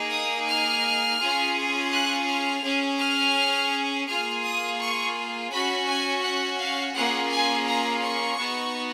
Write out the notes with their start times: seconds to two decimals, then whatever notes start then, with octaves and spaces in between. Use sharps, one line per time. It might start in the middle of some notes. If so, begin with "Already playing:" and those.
Already playing: A#3 D#4 G#4
0.11 D#6
0.47 F6
1.19 C#4 F4 G#4
1.91 F#6
2.27 F6
2.63 C#4 G#4
2.99 F6
4.07 A#3 F4 G#4 F6
4.43 D#6
4.79 C#6
5.51 C#4 F#4 B5
5.87 G#5
6.23 F#5
6.59 F5
6.94 A#3 C#4 F4 G#4 F#5
7.31 G#5
7.67 A#5
8.04 C#6
8.39 B3 D#4 F#4